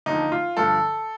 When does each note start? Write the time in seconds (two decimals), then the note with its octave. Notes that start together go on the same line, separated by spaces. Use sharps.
0.06 D#2 D3 F3 D#4
0.32 F4
0.57 G2 D3 F3 A4